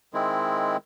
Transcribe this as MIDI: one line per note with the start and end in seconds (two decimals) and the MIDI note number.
0.14 0.77 51
0.14 0.77 56
0.14 0.77 60
0.14 0.77 64